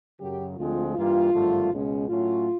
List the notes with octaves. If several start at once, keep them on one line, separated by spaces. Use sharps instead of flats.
F#2 C#3 F#3 G4
D2 D3 F3 G#3 C4 F4
G2 E3 G3 A#3 F4
G#1 G2 D3 F3 A3
C#2 B2 G#3 C#4
A2 F#3 A3 C#4 F4